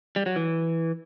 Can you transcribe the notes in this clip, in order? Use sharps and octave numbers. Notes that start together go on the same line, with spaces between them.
G3
F#3
E3